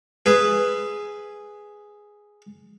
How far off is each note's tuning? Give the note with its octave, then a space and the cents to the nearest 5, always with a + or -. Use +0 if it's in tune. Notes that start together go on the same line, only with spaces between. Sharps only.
G#4 +0 B4 +0 E5 +35